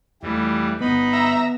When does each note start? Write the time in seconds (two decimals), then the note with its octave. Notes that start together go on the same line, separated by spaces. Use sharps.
0.23 F2 E3 G3 A3
0.81 D1 G1 B3 D#4 B5
1.13 E5 A#5